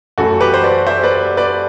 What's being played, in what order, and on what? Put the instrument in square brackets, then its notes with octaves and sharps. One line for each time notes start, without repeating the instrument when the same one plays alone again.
[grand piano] F#2 E3 A3 F#4 A4
G4 B4
C5
B4 D5
C5 E5
B4 D5
B4 D5